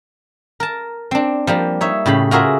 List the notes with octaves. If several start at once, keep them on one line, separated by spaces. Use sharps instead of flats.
A#4 A5
C4 D4
F3 G3 A#3
D#4 C#5 E5
A2 C#3 G4 B5
F4 F#4 G#4 A#4 E5